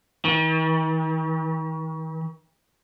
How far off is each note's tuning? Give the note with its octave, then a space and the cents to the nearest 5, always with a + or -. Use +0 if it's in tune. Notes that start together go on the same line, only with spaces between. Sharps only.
D#3 +45